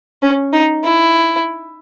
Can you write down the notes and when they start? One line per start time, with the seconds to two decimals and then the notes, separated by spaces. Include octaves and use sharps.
0.22 C#4
0.53 D#4
0.83 E4